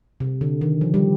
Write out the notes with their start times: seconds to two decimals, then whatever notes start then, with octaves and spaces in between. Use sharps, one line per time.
0.20 C3
0.41 D3
0.61 D#3
0.81 F3
0.94 G3